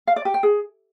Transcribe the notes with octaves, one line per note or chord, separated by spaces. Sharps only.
F5
D5
G4
G5
G#4